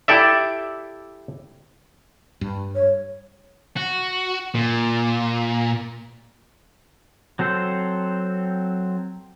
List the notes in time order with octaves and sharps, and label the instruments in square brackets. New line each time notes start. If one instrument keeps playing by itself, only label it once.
[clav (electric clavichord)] E4 G4 A4 D5 E5
[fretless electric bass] G2
[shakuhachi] C#5
[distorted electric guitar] F#4
A#2
[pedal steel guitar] F#3 C4 A4 C5